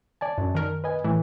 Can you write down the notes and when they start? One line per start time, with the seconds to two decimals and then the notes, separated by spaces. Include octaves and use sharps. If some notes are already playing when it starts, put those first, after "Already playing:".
0.21 D5 G#5 A5
0.38 F#2
0.55 D#3 A#4
0.84 B4 D#5 G#5
1.04 A2 E3